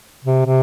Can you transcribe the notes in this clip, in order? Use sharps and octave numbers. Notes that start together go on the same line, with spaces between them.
C3
C3